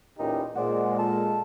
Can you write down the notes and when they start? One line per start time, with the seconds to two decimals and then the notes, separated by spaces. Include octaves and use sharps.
0.19 E2 A#2 C#4 D#4 G4
0.55 A#2 G#3 C5 D5 F#5
0.98 F4 A4 A5